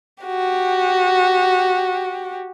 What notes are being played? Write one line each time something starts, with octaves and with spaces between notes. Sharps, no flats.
F#4 G4